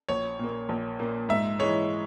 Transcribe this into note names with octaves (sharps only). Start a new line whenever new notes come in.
A#1 C#5
A#2 A#3
A#1
A#2 A#3
G#2 E5
E3 G#3 C#5